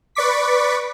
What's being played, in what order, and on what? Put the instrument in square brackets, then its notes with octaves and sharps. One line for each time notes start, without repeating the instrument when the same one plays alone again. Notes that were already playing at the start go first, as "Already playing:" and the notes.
[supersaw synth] B4 D5 C#6 D6 B6